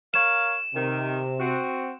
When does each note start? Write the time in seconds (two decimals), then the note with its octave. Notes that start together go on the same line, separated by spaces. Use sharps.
0.14 A#4 C#5 F5 E7
0.75 C3 D#3
1.39 C4 F#4